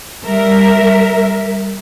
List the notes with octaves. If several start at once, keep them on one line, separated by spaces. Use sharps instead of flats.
G3 A#4 E5